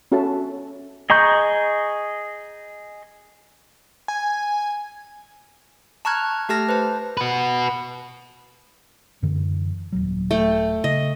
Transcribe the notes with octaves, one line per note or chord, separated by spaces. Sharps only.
C#4 F#4 A4 C#5 E5 A5
G#4 D#5 A#5 C#6 G6
G#5
A5 A#5 C#6 F6 F#6 G#6
A3 G4 A4 A5 F6 A#6
B4 C5 A5
F#4 B4
F#2 D3 E3
D#1 C#2 F#3
A3 G5
C#3 D#5